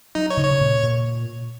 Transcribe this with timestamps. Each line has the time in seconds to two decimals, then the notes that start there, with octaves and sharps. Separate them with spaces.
0.15 F#3 D#4
0.30 C#5
0.37 C#3
0.45 C#5
0.60 A#2
0.83 A#2